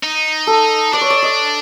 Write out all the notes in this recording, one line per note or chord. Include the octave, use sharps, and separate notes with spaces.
D#4
A4
D4 D5
C#5
D5
D#5